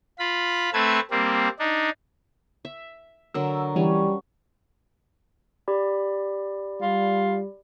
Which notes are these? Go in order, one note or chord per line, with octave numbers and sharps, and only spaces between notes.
F4 B5
A3 C4 B4 A5 G#6
G3 A#3 C4
D4 D#4
E5
D3 F#3 A#4 E6
E3 G3 C#4
G4 D5 B5
G3 F4